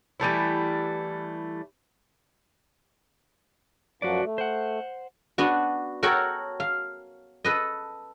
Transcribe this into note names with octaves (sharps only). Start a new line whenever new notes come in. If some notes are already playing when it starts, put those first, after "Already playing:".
E3 G3 A3 E4
F#2 F3 F#3 F#4 B4 D5
A3
C5 F#5
B3 D4 F#4
F#4 A4 A#4 C#5 F#5 G5
F5
A4 B4 D#5